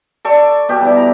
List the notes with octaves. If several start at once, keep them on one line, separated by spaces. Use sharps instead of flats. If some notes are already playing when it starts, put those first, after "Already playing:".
A4 D5 C#6 D6
B2 G4
G3 E4
A#5